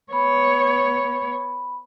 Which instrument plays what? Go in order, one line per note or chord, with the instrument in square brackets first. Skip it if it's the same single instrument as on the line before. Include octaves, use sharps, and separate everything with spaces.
[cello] B3 C#5 [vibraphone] B5